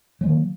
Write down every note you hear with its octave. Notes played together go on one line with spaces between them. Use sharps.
D#3 F#3 G#3 A#3